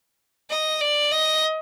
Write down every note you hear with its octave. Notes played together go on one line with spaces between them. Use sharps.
D#5
D5
D#5